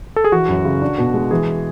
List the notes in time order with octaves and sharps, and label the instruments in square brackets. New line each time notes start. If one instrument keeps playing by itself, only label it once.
[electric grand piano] A4
G#4
[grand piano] E3 [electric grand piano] F#4
[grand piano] F#2
C#3
D4
B2
G#3
[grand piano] E3 [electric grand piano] G#4